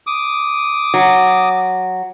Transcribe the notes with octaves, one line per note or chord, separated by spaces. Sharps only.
D6 D#6
F#3